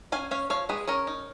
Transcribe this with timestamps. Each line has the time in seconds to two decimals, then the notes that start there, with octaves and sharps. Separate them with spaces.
0.12 C#4 F5 G#5
0.31 C#4 C#5 F5
0.50 F3 C#5 F5
0.69 G#3 G#4 B4
0.88 C#4 A#4 C#5
1.07 D#4